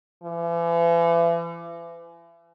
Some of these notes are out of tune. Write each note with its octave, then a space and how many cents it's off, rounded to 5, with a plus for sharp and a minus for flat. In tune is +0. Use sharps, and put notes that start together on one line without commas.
E3 +40